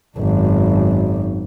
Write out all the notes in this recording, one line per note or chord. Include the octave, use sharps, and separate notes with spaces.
G#1 F#2